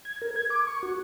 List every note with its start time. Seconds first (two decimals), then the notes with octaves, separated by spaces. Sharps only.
0.05 G#6
0.22 A#4
0.36 G#6
0.50 D6
0.67 C#6
0.83 F#4